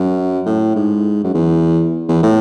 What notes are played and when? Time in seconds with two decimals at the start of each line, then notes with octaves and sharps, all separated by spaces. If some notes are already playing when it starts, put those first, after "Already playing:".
Already playing: F#2
0.46 A2
0.75 G#2
1.24 F#2
1.34 E2
2.09 E2
2.23 A2